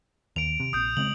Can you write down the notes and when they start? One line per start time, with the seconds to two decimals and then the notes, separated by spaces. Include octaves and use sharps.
0.36 D#2 D7 F7
0.60 C3
0.73 A#1 D#6 G6
0.97 C#3 G#3 C4 F#7